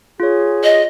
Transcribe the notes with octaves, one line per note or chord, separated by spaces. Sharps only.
F4 G#4 C#5
D#5